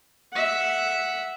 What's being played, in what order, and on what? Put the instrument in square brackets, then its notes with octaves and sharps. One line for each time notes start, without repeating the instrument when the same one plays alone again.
[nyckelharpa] E5 F#5